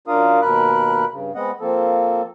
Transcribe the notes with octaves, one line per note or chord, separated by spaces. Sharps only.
F#2 D4 F4 A#4 F5 D#6
D#2 B2 A#4 B5 F#6
G2 C#3
G#3 B3 C4 D#5 F#5
F3 A#3 C4 A4